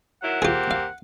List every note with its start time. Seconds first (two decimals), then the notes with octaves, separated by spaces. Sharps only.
0.22 D#3 F#3 E4 F#5
0.42 A#3 C4 F4 G4 G#4
0.71 F5